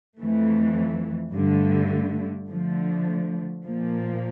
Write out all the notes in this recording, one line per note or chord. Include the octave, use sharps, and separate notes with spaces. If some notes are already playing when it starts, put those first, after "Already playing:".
F2 E3 A3
G2 D3 A3
D3 F3 A3
A#2 F3 A#3